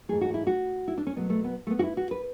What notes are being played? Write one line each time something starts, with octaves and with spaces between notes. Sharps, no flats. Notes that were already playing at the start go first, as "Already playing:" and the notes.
G#2 E3 A3 G#4
F#4
E4
F#4
E4
D4
C#4
B2 F#3 A3 B3
A3
B3
A3
B3
F#4
E4
F#4
B4